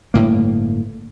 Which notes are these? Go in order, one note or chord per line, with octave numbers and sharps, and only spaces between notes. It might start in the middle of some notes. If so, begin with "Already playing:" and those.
G1 A2 A#3